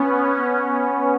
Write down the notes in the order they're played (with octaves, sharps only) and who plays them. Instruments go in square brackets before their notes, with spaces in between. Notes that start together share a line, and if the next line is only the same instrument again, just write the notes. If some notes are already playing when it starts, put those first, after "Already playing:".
Already playing: [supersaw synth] B3 C#4